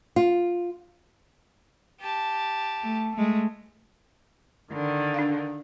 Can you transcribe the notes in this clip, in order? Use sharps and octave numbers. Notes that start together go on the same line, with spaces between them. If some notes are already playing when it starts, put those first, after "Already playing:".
F4
G4 A5
A3
G#3 A3
D3 D#3
D4 F5